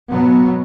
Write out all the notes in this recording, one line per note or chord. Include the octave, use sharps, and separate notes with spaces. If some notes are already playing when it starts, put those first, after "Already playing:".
B2 F#3 B3